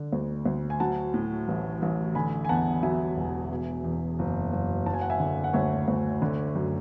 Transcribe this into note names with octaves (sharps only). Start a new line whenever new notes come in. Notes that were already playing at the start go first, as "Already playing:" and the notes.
Already playing: D3
D2
D2
G#5
F#3 F#5 A5
A2
A1
A1
D3 G#5 B5
G#5
E2 F#5 A5
F#3 E5 G#5
E1
B2
E2
F#1
F#1
F#3 A5
G#5
F#5
E5 G#5
D3
F#5
D2 C#5 E5
D2
D3
F#2